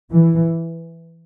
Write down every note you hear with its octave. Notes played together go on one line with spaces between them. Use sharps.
E3